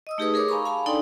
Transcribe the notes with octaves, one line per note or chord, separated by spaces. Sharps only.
D#5 D#6 E6
A3 D#4 G4 G#4 B4 D#6
G#4 A#4 C#5 D6
F5 G#5 A#5 B5 C#6
F5 G#5 A5 B5
D4 D#4 A4 D5 G5 C6